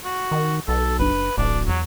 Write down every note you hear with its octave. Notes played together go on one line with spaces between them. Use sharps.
F#4
D#3
B1 A4
F#1 D4 B4
D1 A1 D4
E2 F#3